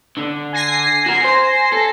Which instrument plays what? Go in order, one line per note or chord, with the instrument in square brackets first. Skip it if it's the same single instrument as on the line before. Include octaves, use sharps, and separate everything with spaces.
[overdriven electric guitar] D3
[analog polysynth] G#5 A#6 C7
[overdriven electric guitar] F#4 A#4
C5
A4